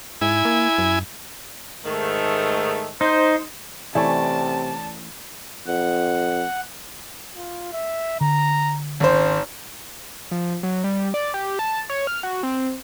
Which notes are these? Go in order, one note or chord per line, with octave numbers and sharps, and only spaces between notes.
G#2 E4 G#5
A#3
F#2
G#2 D#3 A3
D#4 C5
C3 E3 A3 C#4 D5 A5
F2 F#5
F4
E5
D3 A#5
G#1 C#4 C5
F3
F#3
G3
D5
G4
A5
C#5
F6
F#4
C4